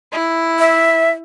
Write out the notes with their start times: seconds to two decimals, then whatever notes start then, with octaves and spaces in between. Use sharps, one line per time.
0.12 E4
0.59 E5